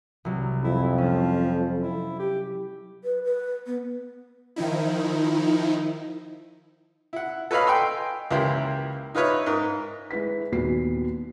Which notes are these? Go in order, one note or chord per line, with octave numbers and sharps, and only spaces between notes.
C2 F#3
F2 E4
F3 C#4
E4
G4
B4
B4
B3
D#3 F3 D#4 E4
E4 F#5
A4 B4 C#5 D#5 F5 B5
G5 G#5 C6 E6
C#2 E3 A#3 E4 G4 C6
D#4 F4 B4 C#5 E5
G#2 A#4
G#3 E4 B4 B6
D#2 A#2 F#3 B3 C7